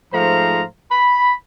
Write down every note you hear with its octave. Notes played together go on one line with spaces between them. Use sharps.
G#2 F3 A3 C5 F5 A#5
B5